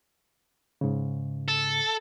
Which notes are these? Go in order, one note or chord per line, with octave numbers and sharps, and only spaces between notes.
G#2 C#3
A4